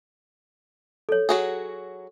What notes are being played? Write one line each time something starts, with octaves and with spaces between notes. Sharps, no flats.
A4 C#5
F#3 F#4 G#4